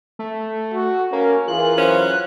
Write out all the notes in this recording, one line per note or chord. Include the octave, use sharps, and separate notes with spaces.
A3
F#4
A#3 C#4
E3 F4 G#4 A#4 F#6
F#3 C#4 C5